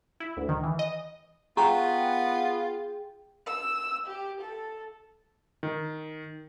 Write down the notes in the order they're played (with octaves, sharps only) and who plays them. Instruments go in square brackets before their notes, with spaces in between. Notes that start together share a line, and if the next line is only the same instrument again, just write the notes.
[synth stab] E4
D2
D#3
E3
D#5
[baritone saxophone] B3 [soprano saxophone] F4 [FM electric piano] G#4 G5 [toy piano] A#5 C#6
[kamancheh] E6
G4
A4
[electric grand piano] D#3